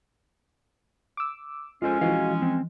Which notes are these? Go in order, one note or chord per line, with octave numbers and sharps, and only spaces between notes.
D6 E6
G#3 C#4 F4 A4 C5
E3 F3 F#4 D#5 F5
C4